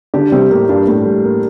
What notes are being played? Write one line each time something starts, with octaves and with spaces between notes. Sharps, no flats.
D3 D4 G4
C3 G3 C4
A2 A3 A#3
G2 G3 D4
A2 A3 G4
G3
A#3